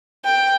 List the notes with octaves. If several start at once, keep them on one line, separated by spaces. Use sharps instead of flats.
G5